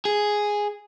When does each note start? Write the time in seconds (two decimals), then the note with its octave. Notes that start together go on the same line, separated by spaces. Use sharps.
0.05 G#4